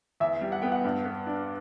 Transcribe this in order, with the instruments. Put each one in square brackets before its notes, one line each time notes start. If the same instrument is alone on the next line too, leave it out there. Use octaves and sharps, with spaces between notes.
[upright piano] E2 E5
G3
F#5
B3 G5
F#5
G2
B3
D4